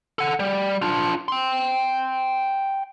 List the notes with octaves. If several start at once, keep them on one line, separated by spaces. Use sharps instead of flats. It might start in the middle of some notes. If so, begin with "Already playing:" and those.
A4 F#5
G3
D4 F4
G5 C6